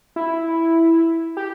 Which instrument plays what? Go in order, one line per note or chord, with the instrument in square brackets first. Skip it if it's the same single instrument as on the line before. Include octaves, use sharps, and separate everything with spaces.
[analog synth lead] E4
G4